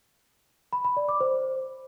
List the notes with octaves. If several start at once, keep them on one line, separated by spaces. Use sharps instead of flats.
B5
B5
D5
D6
C5